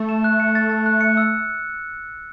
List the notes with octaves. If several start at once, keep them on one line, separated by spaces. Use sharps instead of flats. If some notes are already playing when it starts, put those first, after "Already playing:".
Already playing: A3
E7
F#6
C#7
A6
A6
F#6
C#7
E6